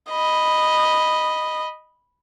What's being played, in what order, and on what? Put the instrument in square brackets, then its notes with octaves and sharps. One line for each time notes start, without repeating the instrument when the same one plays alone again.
[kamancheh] D#5 B5